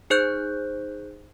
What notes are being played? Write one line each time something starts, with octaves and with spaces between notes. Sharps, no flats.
D#4 G#4 C5 F#6 G6